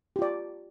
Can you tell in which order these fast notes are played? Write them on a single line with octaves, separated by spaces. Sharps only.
G4 F4 D5